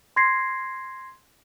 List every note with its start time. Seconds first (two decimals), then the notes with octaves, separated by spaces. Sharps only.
0.16 C6 G#6 A#6 C7